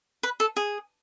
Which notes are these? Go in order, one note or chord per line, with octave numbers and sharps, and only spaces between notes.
B4
A4
G#4